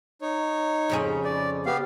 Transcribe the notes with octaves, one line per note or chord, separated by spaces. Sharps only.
D#4 C#5
F2 C#3 G#4
D5
B3 G4 F5